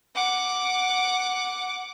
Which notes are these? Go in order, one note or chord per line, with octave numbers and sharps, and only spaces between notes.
F#5 D6